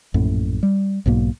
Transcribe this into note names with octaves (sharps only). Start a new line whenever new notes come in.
A#1 F#2 A2
G3
B1 G#2 B2 A#3